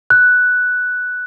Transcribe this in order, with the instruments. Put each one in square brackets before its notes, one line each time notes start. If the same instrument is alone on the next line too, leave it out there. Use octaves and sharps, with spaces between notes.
[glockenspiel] F#6